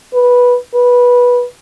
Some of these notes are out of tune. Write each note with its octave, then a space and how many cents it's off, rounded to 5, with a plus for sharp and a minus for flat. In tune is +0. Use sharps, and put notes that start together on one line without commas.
B4 -10
B4 -15